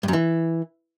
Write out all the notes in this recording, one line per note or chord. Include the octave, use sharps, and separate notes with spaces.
G2
F#2
E3